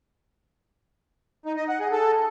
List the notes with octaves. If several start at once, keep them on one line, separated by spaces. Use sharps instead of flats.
D#4
D#5
F#5
G#4
A4